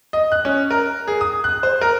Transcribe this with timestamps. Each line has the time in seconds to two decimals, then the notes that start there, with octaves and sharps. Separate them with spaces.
0.13 D#5
0.32 F#6
0.45 C#4
0.71 A#4
1.08 G#4
1.21 D#6
1.44 F#6
1.63 C5
1.81 A#4